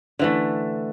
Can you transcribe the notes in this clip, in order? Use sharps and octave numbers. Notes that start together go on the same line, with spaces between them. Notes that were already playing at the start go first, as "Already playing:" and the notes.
D3 E3 A3